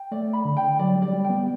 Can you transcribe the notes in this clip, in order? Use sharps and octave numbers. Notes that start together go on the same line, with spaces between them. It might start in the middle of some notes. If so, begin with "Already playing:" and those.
Already playing: G5
A3 D5
B5
D3
G5
F#3 D5
G3
D5
G3
G5
B3